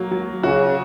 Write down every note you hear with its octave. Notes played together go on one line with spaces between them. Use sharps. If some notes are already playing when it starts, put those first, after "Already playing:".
Already playing: F#3 A#3
F#3
C#3 F#4